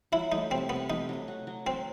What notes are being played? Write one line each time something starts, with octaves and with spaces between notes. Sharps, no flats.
F#3 E4
A3 D#4
C3 C4
C3 B3
A3 D#4
F#3
F#4
F#3
F#3 C4